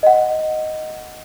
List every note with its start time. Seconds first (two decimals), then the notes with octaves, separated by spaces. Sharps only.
0.03 D#5 F#5